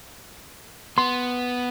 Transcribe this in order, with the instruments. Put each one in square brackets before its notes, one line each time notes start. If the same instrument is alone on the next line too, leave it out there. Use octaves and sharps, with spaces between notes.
[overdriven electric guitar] B3 [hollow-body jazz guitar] C6